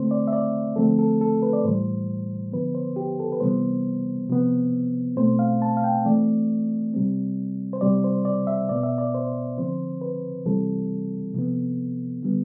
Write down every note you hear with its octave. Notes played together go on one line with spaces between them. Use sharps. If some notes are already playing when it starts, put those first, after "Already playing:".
Already playing: D3 A3 C4 C5
D5
E5
D5
D3 F3 A3 C4 A4
A4
A4
B4
D5
A2 E3 G3 C5
D3 F3 B3 B4
C5
G4
A4
B4
C3 E3 G3 B3 C5
C3 F3 B3
B2 A3 C4 C5
F5
A5
F5
G5
E3 A3 C4 D5
C3 G3 C4
C5
C3 G3 C4 D5
C5
D5
E5
B2 B3 D5
E5
D5
C5
D3 F3 C4 C5
B4
C3 E3 G3 C4 A4
C3 F3 B3
D3 G3 B3